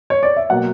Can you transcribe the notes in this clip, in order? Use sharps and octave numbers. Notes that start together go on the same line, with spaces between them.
C#5
D5
E5
B2 F#3 A#3 F#5